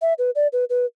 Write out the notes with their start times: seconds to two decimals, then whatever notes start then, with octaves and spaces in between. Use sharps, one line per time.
0.02 E5
0.19 B4
0.35 D5
0.53 B4
0.70 B4